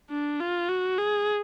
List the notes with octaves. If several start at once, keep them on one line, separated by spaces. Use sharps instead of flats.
D4
F4
F#4
G#4